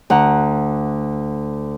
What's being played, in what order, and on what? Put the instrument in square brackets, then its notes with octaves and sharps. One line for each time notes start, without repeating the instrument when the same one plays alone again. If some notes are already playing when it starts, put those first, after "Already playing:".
[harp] D2 F#5 A#5